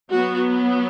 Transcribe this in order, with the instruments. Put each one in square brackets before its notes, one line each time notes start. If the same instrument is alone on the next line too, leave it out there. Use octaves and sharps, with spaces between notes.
[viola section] F#3 B3 F#4